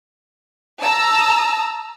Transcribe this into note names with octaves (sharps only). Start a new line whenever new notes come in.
A5 A#5 E6